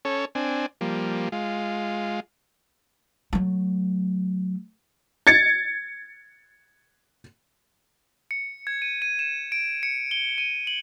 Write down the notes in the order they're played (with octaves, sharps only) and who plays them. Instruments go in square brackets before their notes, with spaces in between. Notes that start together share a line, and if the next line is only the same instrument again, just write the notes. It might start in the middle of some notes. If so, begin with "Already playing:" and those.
[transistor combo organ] C#4 A4 C#5
C4 D4 G#5
F3 G3 A#3
G#3 F4
[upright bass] F#3 A3
[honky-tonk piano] G#6 A6 C#7
[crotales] C#7
G#6
D#7
D#7
E7
D7
C#7
G7
D#7
F#7